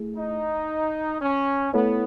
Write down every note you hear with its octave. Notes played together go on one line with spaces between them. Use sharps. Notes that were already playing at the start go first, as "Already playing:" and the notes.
Already playing: A3 E4 G#4
D#4
C#4
A3 B3 E4 A4 C#5